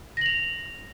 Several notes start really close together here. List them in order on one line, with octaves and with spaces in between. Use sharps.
A#6 F#7 F7